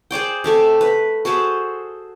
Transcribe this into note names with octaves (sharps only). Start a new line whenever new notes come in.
G#4 C5 D5 G5
C3 A3 A4
B4
F#4 G#4 A4 C5